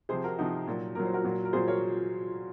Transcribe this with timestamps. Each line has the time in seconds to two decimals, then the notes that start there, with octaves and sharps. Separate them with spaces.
0.09 C3 F3 G#4 C5
0.24 F#4 A#4
0.38 C3 F3 D#4 F#4
0.67 A#2 F#3
0.95 A#2 F#3 A#4
1.05 C5
1.14 F#4 A#4
1.24 A#2 F#3
1.45 A#4
1.53 A#2 F#3 G#4 C5
1.68 A#4 C#5